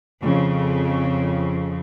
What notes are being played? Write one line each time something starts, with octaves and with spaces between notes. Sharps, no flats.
F2 C#3